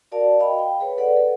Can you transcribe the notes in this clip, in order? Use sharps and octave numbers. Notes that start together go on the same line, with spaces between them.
F#4 A#4 D5 F5 A5
D#5 F5 G5 B5
G5
G#4 B4 C#5
A4 B4 D5 F#5
A4